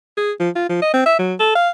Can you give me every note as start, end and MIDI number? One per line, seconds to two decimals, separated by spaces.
0.17 0.32 68
0.40 0.50 53
0.55 0.68 65
0.69 0.81 53
0.82 0.90 75
0.94 1.02 60
1.06 1.17 76
1.19 1.34 54
1.40 1.51 69
1.55 1.70 77